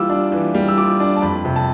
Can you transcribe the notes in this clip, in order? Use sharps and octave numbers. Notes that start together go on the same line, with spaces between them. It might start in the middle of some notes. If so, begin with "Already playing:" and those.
Already playing: E3 G3 F4 D6 E6
D4
E3
G3
E6
F4 D6
D4
A5
F2 B5
C3
A5